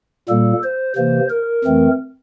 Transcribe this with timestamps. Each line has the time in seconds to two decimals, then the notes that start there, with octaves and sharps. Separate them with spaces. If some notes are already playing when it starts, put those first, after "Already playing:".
0.29 A#2 G3 A#3 A4
0.63 C5
0.96 C3 E3 A#3 C5
1.30 A#4
1.64 F2 E3 A3 C4